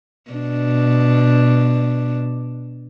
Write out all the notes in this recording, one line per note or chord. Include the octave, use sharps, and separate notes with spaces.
B2 D4